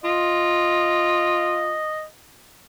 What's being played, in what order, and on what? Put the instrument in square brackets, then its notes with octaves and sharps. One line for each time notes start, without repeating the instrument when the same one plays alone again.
[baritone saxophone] F4 [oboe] D#5